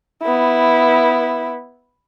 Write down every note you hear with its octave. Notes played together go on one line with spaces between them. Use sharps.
B3 E4